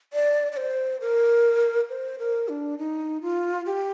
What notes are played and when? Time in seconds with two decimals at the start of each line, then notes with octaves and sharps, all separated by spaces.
0.13 D5
0.52 D5
0.57 C5
1.01 A#4
1.89 C5
2.19 A#4
2.49 D4
2.78 D#4
3.22 F4
3.66 G4